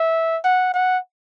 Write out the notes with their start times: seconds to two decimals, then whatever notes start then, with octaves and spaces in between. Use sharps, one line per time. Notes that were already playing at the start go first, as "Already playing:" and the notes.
Already playing: E5
0.45 F#5
0.74 F#5